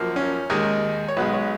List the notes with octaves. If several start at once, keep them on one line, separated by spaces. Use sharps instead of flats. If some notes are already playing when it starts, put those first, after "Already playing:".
Already playing: F#2 F3 A#3
C#4
D#2 D#3 G#3 D#4
C#5
B1 B2 G#3 B4
C#5